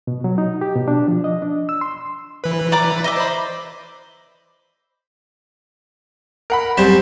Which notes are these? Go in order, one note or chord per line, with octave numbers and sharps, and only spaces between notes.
B2
F#3
D#4
G4
B2
D4
F3
D#5
D4
E6
C6
E3 B4
D5 A#5 D6
D#5 E5 D6
C5 B5
A#4 F#5 B5
F#2 G3 C4 C5 E7